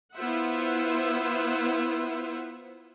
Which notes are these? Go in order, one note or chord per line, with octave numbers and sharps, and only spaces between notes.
B3 E4 F4 C5 E5 F#5